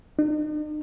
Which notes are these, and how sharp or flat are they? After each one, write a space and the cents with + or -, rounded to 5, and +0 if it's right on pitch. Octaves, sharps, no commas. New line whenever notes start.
D#4 -45